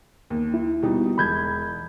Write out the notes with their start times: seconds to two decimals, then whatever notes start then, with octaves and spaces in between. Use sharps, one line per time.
0.30 D#2
0.54 E4
0.82 B2 G3 D#4
1.18 E1 B5 G6 G#6